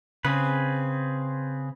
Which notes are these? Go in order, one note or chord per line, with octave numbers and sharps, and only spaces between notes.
C#3 C4 G#4 B4